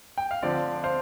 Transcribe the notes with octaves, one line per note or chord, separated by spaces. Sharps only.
G5
F5
D3 F3 C4 D5
C5 F5